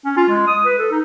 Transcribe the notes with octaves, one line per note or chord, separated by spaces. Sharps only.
C#4
F4
G#3
D#6
B4
A4
D#4